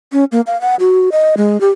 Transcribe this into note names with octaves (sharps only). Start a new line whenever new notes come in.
C#4
A#3
F5
F#5
F#4
D#5
G#3
G4